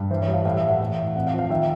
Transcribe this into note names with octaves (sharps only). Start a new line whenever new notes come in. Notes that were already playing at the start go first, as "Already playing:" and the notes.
Already playing: G2
E3 C5
C#5
G3
F5
A2 F5
E5
A2
F#5
E3
A2
F2 F#5
F5
F3
F5
D#3 E5